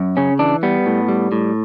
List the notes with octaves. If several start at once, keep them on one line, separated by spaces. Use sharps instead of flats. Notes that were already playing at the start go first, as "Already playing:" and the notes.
Already playing: F#2
C#3 C#4
E3 D4
G3 B3
A2
G3
A2